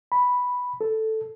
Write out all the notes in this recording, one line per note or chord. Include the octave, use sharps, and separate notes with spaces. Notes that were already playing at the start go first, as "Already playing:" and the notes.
B5
A4